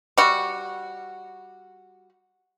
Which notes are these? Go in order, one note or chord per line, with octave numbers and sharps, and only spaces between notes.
G3 F#4